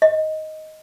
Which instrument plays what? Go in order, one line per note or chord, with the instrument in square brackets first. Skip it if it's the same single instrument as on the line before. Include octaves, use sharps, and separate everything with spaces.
[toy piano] D#5